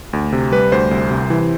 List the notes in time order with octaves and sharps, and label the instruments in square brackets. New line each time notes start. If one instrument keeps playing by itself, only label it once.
[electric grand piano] D2
C3
G3 B4
D2 C5
C2
C3
E3